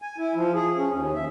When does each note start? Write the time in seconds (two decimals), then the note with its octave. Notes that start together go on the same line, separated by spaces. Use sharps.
0.02 G#5
0.18 E4
0.35 F3
0.54 G#4
0.77 C#4
0.91 D#2
1.15 E5